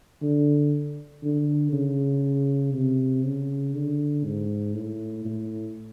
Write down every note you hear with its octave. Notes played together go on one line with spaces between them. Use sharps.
D3
D3
C#3
C3
C#3
D3
G#2
A2
A2